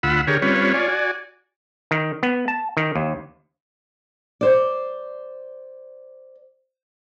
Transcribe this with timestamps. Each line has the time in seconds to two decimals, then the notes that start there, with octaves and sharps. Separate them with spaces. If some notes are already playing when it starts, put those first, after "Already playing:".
0.03 D2 F4 F#5 B5 E6
0.27 D3 G4 G#4 A#4 C#5
0.42 G3 C4 C#4 F4 B4 C#5
0.74 F4 C#5 D5 G#5
0.88 F#4 D5 G#5
1.91 D#3
2.23 B3
2.48 A5
2.77 D#3
2.96 D#2
4.41 C5 D5